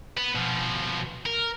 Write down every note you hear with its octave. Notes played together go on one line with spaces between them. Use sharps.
B3
B2 F3
A#4